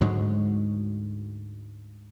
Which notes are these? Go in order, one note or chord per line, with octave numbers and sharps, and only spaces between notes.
D2 G#2 F#3 G#3